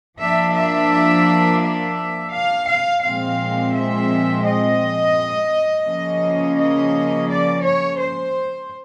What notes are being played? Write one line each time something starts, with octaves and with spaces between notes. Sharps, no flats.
F3 A#3 D4 E5
E5
E5
F5
F5
A#2 F3 G#3 C4 F5
E5
D#5
C#3 F3 A#3 C#4
D#5
D5
C#5
C5